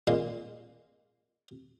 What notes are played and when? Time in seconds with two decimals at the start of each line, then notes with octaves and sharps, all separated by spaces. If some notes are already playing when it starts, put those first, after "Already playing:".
0.07 A#2 G#3 C6